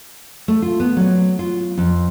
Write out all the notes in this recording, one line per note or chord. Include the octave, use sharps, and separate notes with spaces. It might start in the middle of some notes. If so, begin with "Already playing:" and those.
A3
F4
B3
F#3
F4
F2